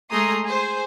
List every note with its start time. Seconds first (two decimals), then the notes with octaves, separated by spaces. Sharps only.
0.11 G#3 A3 G#4 A#5 C6 D#6
0.45 G#4 C5